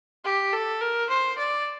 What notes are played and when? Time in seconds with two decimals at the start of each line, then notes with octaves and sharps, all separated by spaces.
0.25 G4
0.53 A4
0.81 A#4
1.10 C5
1.38 D5